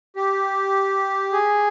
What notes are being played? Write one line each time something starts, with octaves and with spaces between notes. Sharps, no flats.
G4
G#4